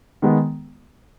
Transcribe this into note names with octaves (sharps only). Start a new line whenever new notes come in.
D#3 G#3 B3